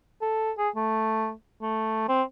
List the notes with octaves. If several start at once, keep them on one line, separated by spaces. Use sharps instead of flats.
A4
G#4
A3
A3
C4